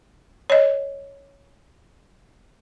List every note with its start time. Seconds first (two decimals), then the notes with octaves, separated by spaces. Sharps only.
0.50 C#5 D#5